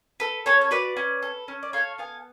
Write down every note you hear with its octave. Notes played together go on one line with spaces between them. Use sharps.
A4 B4
C#4 A4 C#5
C#5
F#4 B4 D5
C#4
A4
C#4
D5
A4 C#5 F5
B3 F5 G#5